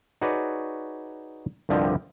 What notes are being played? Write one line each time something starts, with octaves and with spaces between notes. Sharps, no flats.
D#4 F#4 G#4 B4 C#5 D5
C2 G2 D3 F3 G4 D#5